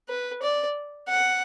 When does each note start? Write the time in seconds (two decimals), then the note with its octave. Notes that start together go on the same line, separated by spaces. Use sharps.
0.09 B4
0.43 D5
1.08 F#5